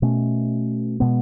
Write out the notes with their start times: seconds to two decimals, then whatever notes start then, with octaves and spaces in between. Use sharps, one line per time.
0.02 B2 A3 C#4
1.00 B2 G#3 B3